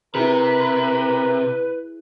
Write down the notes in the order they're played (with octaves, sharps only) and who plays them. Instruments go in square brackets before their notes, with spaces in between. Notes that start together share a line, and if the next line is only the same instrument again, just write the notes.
[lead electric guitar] C3 [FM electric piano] E4 G#4 [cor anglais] A#4 [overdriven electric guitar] B4